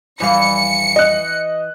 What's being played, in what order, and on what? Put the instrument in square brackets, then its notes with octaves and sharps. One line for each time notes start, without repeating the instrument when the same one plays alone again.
[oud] F2 G3 F5 [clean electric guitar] E3 [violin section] C#7
[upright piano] D#5 F#6